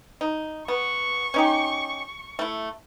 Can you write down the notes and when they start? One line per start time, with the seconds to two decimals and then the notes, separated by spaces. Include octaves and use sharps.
0.21 D#4
0.68 B3 C#6
1.34 C#4 D#4 G4
2.39 A3 E4